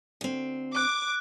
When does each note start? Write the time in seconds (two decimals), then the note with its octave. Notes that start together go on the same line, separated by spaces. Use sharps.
0.21 D2 C4
0.76 D6 F#6